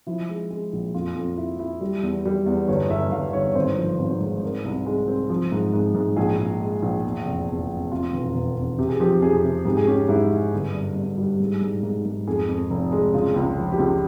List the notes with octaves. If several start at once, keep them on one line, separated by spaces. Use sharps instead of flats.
F3 E4
G#3
G#3
A#1
F2 F4
F2
E4
E4
G3
E2
G3
E2
G1 C#5
G1 E5
G1 F5
G1 C#5
G#1 C5
F3
G#1
G#2
C4 A#4
C2
G#3
C4
F3
G#2
G#2
G#2
A#1 G#4
A#1
G#3
A#1
E2
F1
E2
F1
C3 F4
E1
E1
E1
C3 G4
G#4
F3 G4
F2 G#4
C3
G#2 G4
G#4
C#4 G4
G#2 E4
E4
G1
G2
G2
G3
G#2
G#2
G#2
G#2
F2 G#4
F2
F1
G#3
C#3 F4
C#2
F3
G4
C#2